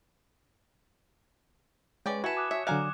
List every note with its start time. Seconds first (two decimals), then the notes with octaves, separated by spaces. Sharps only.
2.06 G#3 C#4 B4 D5 G5
2.24 E4 F#4 B4 G#5 A5 G#6 C#7 E7
2.37 D6 D#6 F#6
2.51 C#5 E5
2.67 D3 F#3 D5 F5 G#5 A#5 F#6